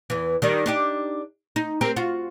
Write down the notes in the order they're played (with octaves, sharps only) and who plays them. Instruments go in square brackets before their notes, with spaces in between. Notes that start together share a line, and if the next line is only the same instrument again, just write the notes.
[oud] E2 E3
D#3 G3 D4
D4 D#4 G4
D#4
C4 G4 A#4
F4 F#4